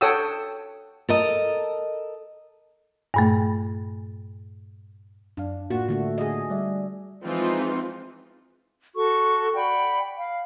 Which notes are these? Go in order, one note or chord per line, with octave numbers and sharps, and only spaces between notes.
A4 C#5 F#5 G5 D#6 E6
A4 A#4 D#5
G2 A#2 A3
F#2 D4 F5
A2 A#3 F4 F#4
D3 A3 D4
G#4 D#5
G3 D5 E5
E3 F3 G#3 C4 D#4 F4
F#4 A4 C#6
D5 F#5 G5 B5
F5